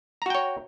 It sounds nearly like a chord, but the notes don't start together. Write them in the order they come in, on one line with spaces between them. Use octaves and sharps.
A#5 F#4 G5 C#5